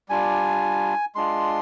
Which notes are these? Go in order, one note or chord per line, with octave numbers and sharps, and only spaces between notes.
G3 D4 F4 G#5
G#3 D4 F4 C6